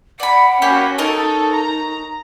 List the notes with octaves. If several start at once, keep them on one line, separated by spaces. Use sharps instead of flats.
D5 F#5 B5
A#3 C#4 F#4 G4 B5
D#4 A4 A#4 C#5 D#5
A#5